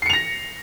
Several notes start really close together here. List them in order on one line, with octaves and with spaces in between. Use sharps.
C7 C#7 F7 A#6